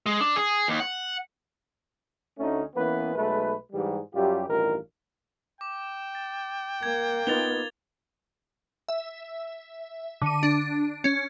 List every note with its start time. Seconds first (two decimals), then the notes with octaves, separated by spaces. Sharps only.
0.06 G#3
0.21 D4
0.36 G#4
0.68 D#2
0.80 F#5
2.39 D2 D3 A3 C#4 D#4
2.75 E3 A#3 B3 C#4 B4
3.15 B1 G#3 A3 B4
3.72 G#2 E3 G3
4.15 F#2 G3 F4 G4
4.48 A1 G2 D#3 F4 A#4
5.61 G5 D6
6.15 A6
6.83 A#3 G#6
7.27 B3 D#4 F4 A6 F7 G7
8.89 E5
10.22 D3 D#7
10.43 D4
11.04 C#4